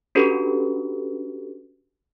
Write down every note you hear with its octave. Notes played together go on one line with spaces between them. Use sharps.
C#4 D4 F#4 G4 A4 B4